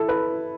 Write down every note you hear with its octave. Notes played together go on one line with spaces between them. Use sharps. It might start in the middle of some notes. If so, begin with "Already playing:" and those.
Already playing: E4 A4
B4